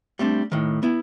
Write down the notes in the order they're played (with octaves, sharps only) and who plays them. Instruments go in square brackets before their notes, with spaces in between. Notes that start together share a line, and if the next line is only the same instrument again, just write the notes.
[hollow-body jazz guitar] G3 A3 C4 D4
A2 D#3
B3 E4